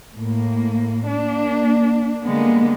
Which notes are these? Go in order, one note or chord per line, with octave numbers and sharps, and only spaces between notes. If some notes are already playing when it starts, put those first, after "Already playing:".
A2 A#3
A#3 D4
D3 G3 G#3 A#3 B3